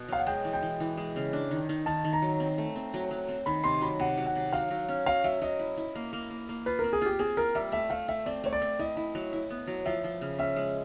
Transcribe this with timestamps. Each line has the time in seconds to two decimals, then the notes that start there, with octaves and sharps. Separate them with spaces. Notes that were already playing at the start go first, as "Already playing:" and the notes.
Already playing: B2
0.09 F#3 F5
0.19 F#5
0.27 G#3 G5
0.45 E3
0.53 G5
0.62 E3
0.80 E3
0.97 G#3
1.16 C#3
1.33 D4
1.51 D#3
1.69 D#3
1.86 D#3 A5
2.04 D#3
2.13 A#5
2.22 F#3
2.40 C4
2.58 A3
2.76 C4
2.94 F#3
3.11 F#3
3.29 C4
3.46 D#3 B5
3.64 C3 C6
3.82 F#3 B5
4.00 C3 F#5
4.18 F#3
4.26 F#5
4.35 C3
4.53 F#3 F5
4.71 F#3
4.89 C#4
5.06 F#3 F5
5.24 F#3 E5
5.42 F#3 D#5
5.59 E4
5.77 E4
5.95 A#3
6.13 A#3
6.30 A#3
6.49 A#3
6.66 F4 B4
6.79 C4 A#4
6.93 G#4
7.02 F4 G4
7.19 C4 G#4
7.37 F4 A#4
7.55 G3 E5
7.72 A3 E5
7.90 A3 F5
8.08 A3 E5
8.26 C4 D5
8.44 A3 C#5
8.53 D5
8.62 C4
8.79 E4 D#5
8.97 E4
9.15 F#3
9.33 E4
9.50 B3
9.68 F#3
9.85 F3 E5
10.04 F3
10.21 C#3
10.39 C#4 E5
10.56 G#3